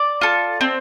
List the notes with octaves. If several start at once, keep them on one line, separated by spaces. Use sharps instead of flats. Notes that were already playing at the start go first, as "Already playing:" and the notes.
Already playing: D5
F4 A4
C4